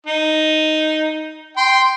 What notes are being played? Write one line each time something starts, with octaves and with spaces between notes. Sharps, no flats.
D#4
G5 C6